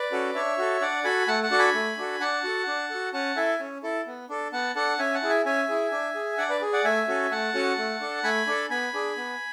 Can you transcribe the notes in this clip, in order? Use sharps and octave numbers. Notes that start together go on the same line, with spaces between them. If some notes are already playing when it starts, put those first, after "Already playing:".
Already playing: B4 D5
C#4 F#4 A4
D4 C#5 E5
F#4 A4
D4 D5 F#5
F#4 A4 G#5 B5
A3 F#5 A5
F#5 A5
D4 F#4 A4
G#5 B5
A3
D4 F#4 A4
D4 F#5 A5
F#4 A4
D4
F#4 A4
C#4 F#5 A5
E4 A4 E5 G#5
C#4
E4 A4
B3
D4 A4
B3 F#5 A5
D4 A4 F#5 A5
C#4 E5 G#5
F#5 A5
E4 G#4
E5 G#5
C#4 E5 G#5
E4 G#4
D4
G#4
D4 D5 F#5
B4 D5
G#4
D5 F#5
A3 E5 G#5
C#4 F#4 A4
A3 F#5 A5
C#4 F#4 A4
A3
D4 A4
A3 G#5 B5
D4 A4
B3 G#5 B5
D4 G#4
B3